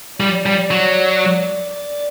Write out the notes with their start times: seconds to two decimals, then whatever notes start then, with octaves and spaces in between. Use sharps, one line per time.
0.20 G3 D5
0.46 G3
0.71 F#3
1.70 D5